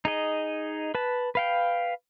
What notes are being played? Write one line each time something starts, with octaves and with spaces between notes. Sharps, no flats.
D#4 G#4 D#5
B4 A5
B4 F5 G5